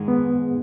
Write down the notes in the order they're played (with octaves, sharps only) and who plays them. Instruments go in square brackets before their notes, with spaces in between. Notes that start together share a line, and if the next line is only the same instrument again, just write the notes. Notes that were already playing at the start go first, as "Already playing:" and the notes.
Already playing: [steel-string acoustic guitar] G#2 D#3 G#3
[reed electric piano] B3